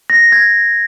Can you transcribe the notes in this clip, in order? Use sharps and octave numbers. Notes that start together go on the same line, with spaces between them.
A#6
G#6